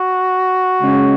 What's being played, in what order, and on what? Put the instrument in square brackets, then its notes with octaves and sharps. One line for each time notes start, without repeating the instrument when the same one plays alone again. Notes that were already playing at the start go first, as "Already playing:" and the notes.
Already playing: [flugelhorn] F#4
[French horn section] C#3 G#3 C#4